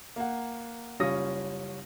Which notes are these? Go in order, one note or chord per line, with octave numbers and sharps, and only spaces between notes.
A#3 F#5
F#1 G3 C#4 F4 D#6 A#6